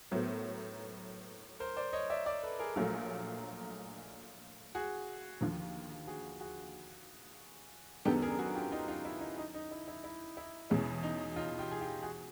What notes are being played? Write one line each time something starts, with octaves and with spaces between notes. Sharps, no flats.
A2 F#3 B3 A#4 C5
A#4 C5
C5 D5
C#5 D#5
D5 E5
D5 E5
A4 B4
G#4 A#4
A#1 A#2 F#3 A3 G#4 A#4
F#4 G#4
D#2 D3 F3
F#4 G#4
F#4 G#4
F#2 D#3 G#3 B3 D4 G4 A4
G#4 A#4
F#4 G#4
F4 G4
D#4 F4
D#4 F4
E4
D#4
D#4
D#4
E4
E4
E4
E4
E2 B2 G#3 C#4 E4
D#4
D#4 F4
F4 G4
G#4
F4 G4
F#4 G#4